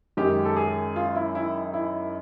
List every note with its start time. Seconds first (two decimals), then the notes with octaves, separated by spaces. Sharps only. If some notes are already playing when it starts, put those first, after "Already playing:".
0.17 F#2 D#3 G#3 G4
0.45 A4
0.56 G#4
0.96 F4
1.16 E4
1.35 E4
1.74 E4